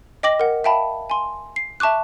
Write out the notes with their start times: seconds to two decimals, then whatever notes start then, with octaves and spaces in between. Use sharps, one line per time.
0.23 D#5 G5 D6 A#6 F#7
0.40 A#4 F#5
0.64 E5 F5 G5 A5 B5
1.10 G#5 C6
1.56 C7
1.80 E5 A5 C#6 D6 F#6